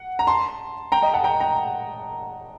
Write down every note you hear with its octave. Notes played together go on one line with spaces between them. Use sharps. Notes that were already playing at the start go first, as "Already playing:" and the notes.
Already playing: F#5
A#5
A5 C6
G5 A#5
D#5 G5
F#5 A5
G5 A#5
G5 A#5